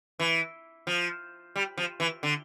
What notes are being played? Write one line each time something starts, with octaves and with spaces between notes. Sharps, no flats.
E3
F3
G3
F3
E3
D3